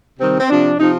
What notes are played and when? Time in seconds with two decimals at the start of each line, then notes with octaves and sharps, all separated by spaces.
0.19 C3 D#3 G3 C4
0.39 C4
0.48 C3 F3 D4
0.78 C3 F3 D#4